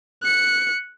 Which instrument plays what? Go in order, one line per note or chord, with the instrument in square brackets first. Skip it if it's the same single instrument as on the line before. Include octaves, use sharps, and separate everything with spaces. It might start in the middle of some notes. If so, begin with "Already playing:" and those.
[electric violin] F#6 C#7